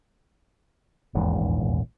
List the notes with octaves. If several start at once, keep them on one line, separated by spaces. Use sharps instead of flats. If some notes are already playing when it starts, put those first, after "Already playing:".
D#1 A#1 E2 G#2